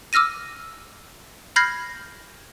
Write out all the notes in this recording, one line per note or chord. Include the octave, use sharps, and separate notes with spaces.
D6 E6 F6 A#6 D#7
B5 F6 G6 G#6 A#6 C7